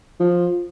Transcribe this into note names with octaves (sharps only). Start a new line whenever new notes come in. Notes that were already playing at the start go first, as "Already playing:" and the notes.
F3